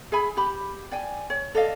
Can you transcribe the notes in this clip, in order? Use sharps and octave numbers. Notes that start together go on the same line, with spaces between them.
G#4 E5 G#5 B5
G4 B5
D5 G5 G#5
C#5
A4 D5 D#5 F5